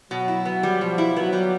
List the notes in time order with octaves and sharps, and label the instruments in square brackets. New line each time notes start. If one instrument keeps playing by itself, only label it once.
[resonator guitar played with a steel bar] B2 [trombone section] F#3
[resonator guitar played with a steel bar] E4
B3
G3
[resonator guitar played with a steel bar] B2 [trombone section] F3
[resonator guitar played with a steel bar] E4
[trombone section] F#3 [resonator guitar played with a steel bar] B3
[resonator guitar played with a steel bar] G3